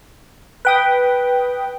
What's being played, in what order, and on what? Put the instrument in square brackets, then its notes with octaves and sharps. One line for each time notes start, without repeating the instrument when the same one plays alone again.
[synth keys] B4 G5 D#6